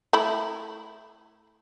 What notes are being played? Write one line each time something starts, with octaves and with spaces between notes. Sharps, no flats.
A3 E4 B5